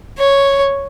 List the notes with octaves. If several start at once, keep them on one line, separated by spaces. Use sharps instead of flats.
C#5